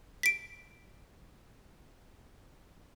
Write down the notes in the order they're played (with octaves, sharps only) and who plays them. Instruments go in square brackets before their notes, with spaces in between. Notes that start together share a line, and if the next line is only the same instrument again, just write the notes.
[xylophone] B6 D7